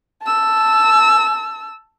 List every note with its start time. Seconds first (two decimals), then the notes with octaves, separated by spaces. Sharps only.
0.23 A5 E6